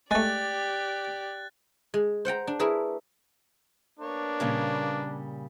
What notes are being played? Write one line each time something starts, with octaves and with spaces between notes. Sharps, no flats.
G#3 A3 G4 D5 F#6 A6
G#3
C5 F#5 G5 A#5
D4
A3 E4 G#4 A#4 B4
A#3 B3 D4 C#5
A#2 C#3 G3